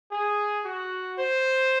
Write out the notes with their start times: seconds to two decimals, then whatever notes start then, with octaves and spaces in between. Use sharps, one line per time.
0.11 G#4
0.65 F#4
1.19 C5